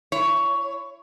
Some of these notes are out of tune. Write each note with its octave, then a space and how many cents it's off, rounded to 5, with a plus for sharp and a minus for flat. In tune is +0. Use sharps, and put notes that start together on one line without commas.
E4 +35 C#5 +15